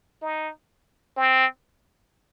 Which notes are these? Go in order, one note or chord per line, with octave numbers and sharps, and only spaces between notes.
D#4
C4